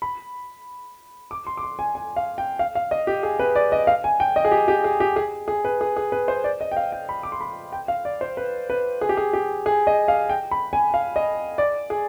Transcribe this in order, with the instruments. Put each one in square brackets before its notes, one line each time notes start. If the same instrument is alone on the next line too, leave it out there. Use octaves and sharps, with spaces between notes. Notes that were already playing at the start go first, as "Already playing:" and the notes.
[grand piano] B5
D6
C6
D6
C6
G#5
G#5
F5
G5
F5
F5
D#5
G4
G#4
B4
D5
D#5
F5
G#5
G5
D#5
G#4
G4
G4
G#4
G4
G#4
G#4
B4
G#4
G#4
B4
C5
D5
D#5
G5
F5
G5
B5
D6
C6
B5
G5
F5
D5
C5
B4
B4
G#4
G4
G#4
G4
G#4
D#5
F5
G5
B5
G#5
F5
D#5
D5
G#4